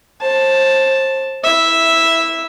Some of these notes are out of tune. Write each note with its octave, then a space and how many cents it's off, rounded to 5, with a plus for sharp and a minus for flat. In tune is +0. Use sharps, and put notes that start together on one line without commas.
C5 +30 A5 +0
E4 -10 E5 +0